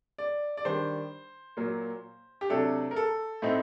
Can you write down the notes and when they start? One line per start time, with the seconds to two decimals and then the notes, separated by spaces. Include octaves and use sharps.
0.18 D5
0.57 D5
0.65 D#3 G3 D4 C5
1.57 A#2 F#3 A#3
2.41 G4
2.50 C3 F#3 A3 D4 A4
2.91 A#4
2.96 A4
3.42 A2 A3 C4 D#4